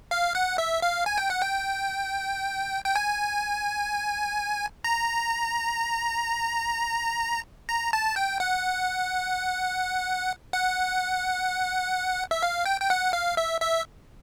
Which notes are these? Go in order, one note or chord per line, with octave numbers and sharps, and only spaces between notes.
F5
F#5
E5
F5
G#5
G5
F#5
G5
G5
G#5
A#5
A#5
A5
G5
F#5
F#5
E5
F5
G5
G5
F#5
F5
E5
E5